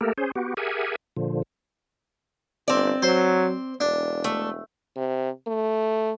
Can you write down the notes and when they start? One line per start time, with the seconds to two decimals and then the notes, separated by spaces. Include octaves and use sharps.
0.01 A3 A#3 G4 A4 A#4
0.18 C#4 G#4 C5
0.35 B3 F#4 G4
0.57 G4 G#4 A#4 E5 F#5 G#5
1.17 A#2 D3 F3
2.68 G1 C4 D5
3.02 F#3 C5
3.80 E1 D4
4.24 A3
4.96 C3
5.47 A3